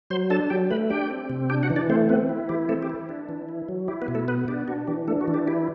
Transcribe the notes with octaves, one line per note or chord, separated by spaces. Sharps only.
F#3 C5 C6
D4 A4 A5
F#3 G4 G5
A3 B4 B5
D4 G4 G5
C4
C3
D4 G4 G5
F#4 F#5
E3
D4 D5
A3 C4 C5
B3 C4 B4
E4
E3 G4
A3 C4 A4
G4
E4
D4
E3
E4
F#3
E4 G4
B3 B4
B2
A3 A4
B3 B4
D4 G4
D4 F#4
E3 G4
A3 D4 A4
F#4
E3
G4
E4 G4